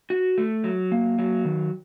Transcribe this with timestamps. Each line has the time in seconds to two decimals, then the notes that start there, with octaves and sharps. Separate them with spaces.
0.10 F#4
0.38 A3
0.64 F#3
0.92 A#3
1.19 F#3
1.45 D#3